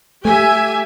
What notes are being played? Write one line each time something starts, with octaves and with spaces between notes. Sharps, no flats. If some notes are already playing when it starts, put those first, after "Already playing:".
A3 G4 E5 G#5